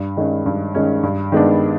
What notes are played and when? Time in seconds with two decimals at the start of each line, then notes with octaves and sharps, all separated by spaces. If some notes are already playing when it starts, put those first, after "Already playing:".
Already playing: G2
0.17 D#3 G#3 C#4
0.46 G2
0.75 D#3 G#3 C#4
1.03 G2
1.32 D#3 G#3 B3 D4